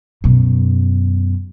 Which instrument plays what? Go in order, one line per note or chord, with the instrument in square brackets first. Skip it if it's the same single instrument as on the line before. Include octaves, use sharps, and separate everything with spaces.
[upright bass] F#2 B2